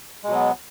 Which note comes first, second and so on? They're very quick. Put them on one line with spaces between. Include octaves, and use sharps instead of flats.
G#3 B2 F#3 B3